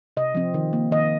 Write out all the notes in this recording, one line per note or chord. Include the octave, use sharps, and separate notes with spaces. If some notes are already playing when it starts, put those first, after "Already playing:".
C3 D#5
F3 C4
D#3
A#3
D#3 D#5